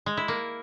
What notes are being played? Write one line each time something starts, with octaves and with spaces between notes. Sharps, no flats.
G#3
E4
A#3